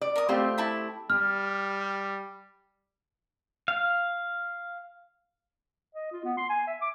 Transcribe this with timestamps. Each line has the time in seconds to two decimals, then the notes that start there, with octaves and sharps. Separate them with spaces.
0.01 D5
0.16 A#4 D#6
0.29 A3 C4 F4 G4
0.58 E4 A5 B5
1.10 G3 F6
3.68 F5
5.95 D#5
6.12 F4
6.24 B3
6.37 C6
6.49 G#5
6.67 E5
6.82 D6